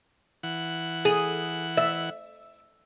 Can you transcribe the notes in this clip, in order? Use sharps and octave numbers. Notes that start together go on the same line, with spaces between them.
E3 F#5
G#4
E5